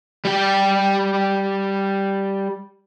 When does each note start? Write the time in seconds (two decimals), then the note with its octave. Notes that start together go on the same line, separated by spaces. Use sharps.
0.25 G3 G4